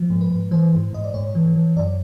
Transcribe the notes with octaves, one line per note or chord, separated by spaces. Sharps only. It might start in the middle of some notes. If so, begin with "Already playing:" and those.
Already playing: F3
G#2
B4
G#2
E3 C5
G#2
G#2 D#5
D5
G#2 C#5
E3
E3
F#2 D5